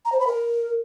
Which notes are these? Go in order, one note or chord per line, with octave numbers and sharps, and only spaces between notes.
A#5
C5
B5
A#4